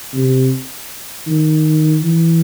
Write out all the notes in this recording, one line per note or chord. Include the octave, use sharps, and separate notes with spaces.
C3
D#3
E3